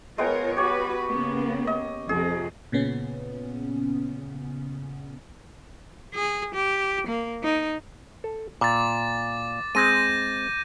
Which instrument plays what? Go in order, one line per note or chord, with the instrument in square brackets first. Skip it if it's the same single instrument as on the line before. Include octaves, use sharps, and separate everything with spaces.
[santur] G#3 B3 G5 [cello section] F4 A#4 C#5
[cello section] F#4 B4 [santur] G4 C#5
[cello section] C#3 A#3 B3
[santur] D#5
[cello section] F2 C3 [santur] G#4
[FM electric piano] A#2 C#3 B3 C#4
[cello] G#4
G4
A#3
D#4
[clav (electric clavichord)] A4
[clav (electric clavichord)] A#2 [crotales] D6 A6
[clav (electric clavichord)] G#3 C4 G#4 [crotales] G6 A#6 D#7